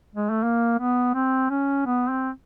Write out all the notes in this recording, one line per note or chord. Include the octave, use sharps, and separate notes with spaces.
G#3
A3
A#3
B3
C4
C#4
B3
C4